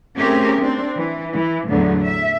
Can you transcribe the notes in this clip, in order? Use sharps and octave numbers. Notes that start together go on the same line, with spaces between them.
A3 C4 C#4 G4 G#4 A#4
C4 D4
E3
E3
E2 A2 D3 F#3 B3
E5